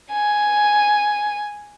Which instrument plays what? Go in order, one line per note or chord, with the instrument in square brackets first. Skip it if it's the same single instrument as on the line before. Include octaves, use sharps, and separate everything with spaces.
[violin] G#5